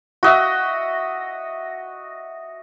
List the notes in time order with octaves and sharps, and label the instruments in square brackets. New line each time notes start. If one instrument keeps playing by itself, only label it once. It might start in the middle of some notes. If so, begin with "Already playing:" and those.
[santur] F#4 D#5 E5